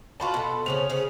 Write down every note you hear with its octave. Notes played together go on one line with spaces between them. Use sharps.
B3 F4 F#4 A5 B5 C6
B2 A4
C#3 B3 C#4 C5 F7
C#3 G#4 C5